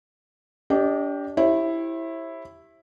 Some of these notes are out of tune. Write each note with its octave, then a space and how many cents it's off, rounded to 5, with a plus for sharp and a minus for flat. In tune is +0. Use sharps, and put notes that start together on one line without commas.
D4 -35 G4 +0 D#5 +0
E4 +0 G4 +0 C5 +45